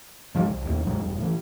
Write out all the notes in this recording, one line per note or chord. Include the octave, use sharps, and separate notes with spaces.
G#2 F3 F#3 G#3
C2
D#2 A2
F#2 B2 F#3 G#3
E1 G2
A2 E3